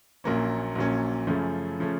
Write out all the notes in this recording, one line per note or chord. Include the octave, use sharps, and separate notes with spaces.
A#1 A#2 F#3 A#3 C#4
A#1 A#2 F#3 A#3 C#4
F#2 C#3 F3 A3 C#4
C#3 F3 A3 C#4